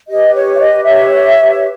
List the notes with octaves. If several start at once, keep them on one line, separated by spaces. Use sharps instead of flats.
G4 B4 D#5
C#5
E5
D#5
C#5 E5